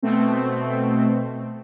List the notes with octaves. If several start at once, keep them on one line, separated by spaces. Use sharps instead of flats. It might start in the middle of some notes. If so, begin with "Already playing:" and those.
B2 A3 C4